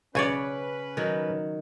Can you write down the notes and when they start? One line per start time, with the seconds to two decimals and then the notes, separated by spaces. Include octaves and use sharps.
0.15 B1 C#3 C#4 B4 C#5 D5 G#5
0.97 D#3 F#3